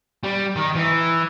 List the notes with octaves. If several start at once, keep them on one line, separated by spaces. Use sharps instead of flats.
G3
D#3
E3